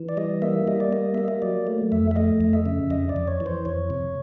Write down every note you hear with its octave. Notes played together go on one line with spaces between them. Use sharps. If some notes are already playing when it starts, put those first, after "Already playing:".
Already playing: E3
D5
G3 D#5
A#3 E5
G3 D#5
D5
A#3 D#5
A#3 E5
D#5
F#3 D5
A3
F2 E5
E5
A3 D#5
F2
E5
C#3
F2 D#5
D5
F2
C#5
E3
C5
F2 C#5
C3